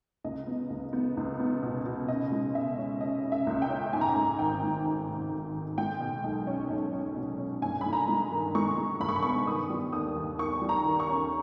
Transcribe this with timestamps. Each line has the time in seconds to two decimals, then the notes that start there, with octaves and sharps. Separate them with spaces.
0.24 C#2 D#5
0.47 B3
0.70 C#2
0.93 B3
1.17 C#2
1.40 B3
1.62 B2
1.86 B2
2.08 C#3 D#5
2.32 G#3
2.55 C#3 E5
2.78 C#4
3.01 C#3 D#5
3.24 C#3
3.32 E5
3.47 C#2
3.62 G5
3.70 C#4
3.93 G#2 G#5
4.01 A#5
4.09 G#5
4.16 G#2
4.39 G#1 G5
4.63 G#2
4.85 G#1
5.09 G#2
5.32 G#1
5.55 G#1
5.78 G#3 G5
6.00 B2
6.24 B1
6.47 C#4
6.70 B1
6.93 C#4
7.16 B2
7.38 C#4
7.62 G2 G#5
7.81 G2 B5
7.93 A#5
8.08 G#3
8.31 D#3
8.55 G#3 C#6
8.78 G#3
9.00 G2 B5
9.09 C#6
9.16 B5
9.23 B3 C#6
9.31 B5
9.47 D#3 D#6
9.70 G3
9.93 D#2 D#6
10.16 D#2
10.38 D#3 C#6
10.62 G3
10.69 A#5
10.85 D#3
11.00 C#6
11.09 C#4